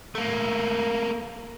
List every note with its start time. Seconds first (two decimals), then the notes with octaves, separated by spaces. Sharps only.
0.15 A3 A#3